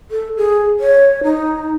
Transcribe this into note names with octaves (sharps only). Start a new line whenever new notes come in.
A4
G#4
C#5
D#4